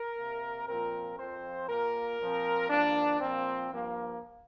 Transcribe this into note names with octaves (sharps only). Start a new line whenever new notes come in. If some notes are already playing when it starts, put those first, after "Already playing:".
Already playing: A#4
C3 A#3
A#2 F3 C4 A#4
F2 F3 C4 C5
A#2 A#3 A#4
A#2 F3 C4
G2 F3 A#3 D4
A#2 F3 A#3 C4
G2 F3 A#3